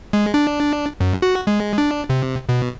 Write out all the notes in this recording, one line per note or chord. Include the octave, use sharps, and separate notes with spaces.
G#3
D4
F#2
F#4
G#3
D4
C3
B2